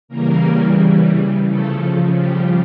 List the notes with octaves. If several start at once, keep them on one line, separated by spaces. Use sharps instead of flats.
C#3 E3 G3 A#3 A#4
C#3 F3 A3 A4
G3 G4